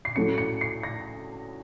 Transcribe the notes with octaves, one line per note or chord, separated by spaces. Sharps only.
C7
A2 F#3 A3 C#4 C#7
C#7
C7
A#6